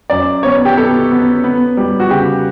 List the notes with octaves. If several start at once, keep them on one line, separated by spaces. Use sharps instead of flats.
F#2 D5
B3 C#5
G4
B3 A4
B3
B3
G3
F#4
C#3 G4